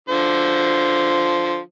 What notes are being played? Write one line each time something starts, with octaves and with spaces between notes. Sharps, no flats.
D3 F3 C5